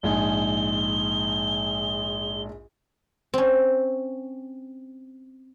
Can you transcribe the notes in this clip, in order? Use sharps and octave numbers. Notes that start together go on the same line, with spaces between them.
A#1 G#2 G#5 G7
C4 C#4